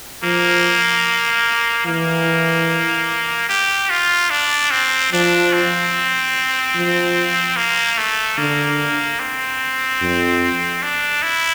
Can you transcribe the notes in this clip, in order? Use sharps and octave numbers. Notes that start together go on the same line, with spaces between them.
F3 A#3
E3 A#3
G4
F4
D4
C4
F3 D4
C4
F3
A#3
A3
D3 A#3
C4
F2
D4
E4